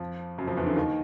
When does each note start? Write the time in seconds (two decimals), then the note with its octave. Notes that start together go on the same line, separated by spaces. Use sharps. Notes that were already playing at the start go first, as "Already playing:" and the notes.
Already playing: F2 F3
0.38 F#2 F#3
0.47 F2 F3
0.57 E2 E3
0.67 D3
0.76 D#2 D#3